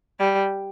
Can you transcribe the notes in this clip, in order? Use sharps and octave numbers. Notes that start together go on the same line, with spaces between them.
G3